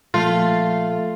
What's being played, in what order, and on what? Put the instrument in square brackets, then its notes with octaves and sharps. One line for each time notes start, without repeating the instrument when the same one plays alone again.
[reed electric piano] A#2 F3 A6 [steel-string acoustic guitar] A3 [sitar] F4